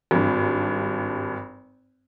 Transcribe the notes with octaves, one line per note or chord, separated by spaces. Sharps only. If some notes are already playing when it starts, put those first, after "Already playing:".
G#1 G2